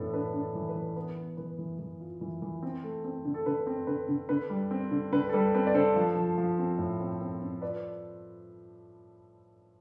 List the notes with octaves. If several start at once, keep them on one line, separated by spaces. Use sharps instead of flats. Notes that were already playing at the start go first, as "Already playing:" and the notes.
Already playing: A2 E3 B3 D4 A4
D4 B4
D4
A4
E3
B4
E3
B3 B4
B3
E3 B4
E3
E3
F4
E3
E3
C4
A3
C4
D3
A4
D3 B4
C4
D3 B4
D3
D3 B4
G3
C4
D3
D3 B4
A4
G3 B4
C4 B4
D5
D3 A4 C5
F3
F3
F3
C4
A2
C4
C4
C4
F4 B4 D5